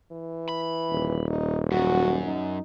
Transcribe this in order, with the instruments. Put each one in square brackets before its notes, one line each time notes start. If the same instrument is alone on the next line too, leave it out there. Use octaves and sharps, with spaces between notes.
[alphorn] E3
[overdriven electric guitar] B5
[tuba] D#1
[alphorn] D#4
[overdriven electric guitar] F#2 [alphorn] F#4
[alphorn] D#4